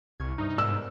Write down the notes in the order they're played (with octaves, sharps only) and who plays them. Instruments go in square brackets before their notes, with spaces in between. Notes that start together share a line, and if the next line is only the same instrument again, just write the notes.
[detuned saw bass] C2 [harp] C#6 F6 G#6
[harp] G2 C3 [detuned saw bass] D#4
[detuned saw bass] G#2 [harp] B3 A#4 D7 [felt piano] E6